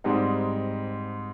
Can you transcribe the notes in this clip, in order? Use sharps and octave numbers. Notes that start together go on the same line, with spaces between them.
G#2 G3 C4 D#4